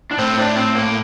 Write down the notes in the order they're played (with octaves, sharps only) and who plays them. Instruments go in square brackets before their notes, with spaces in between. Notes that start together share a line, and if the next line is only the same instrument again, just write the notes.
[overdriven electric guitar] D4
[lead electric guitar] A2 [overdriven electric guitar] C4
[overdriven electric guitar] D4
C4
A#3